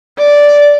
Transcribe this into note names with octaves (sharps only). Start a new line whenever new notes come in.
D5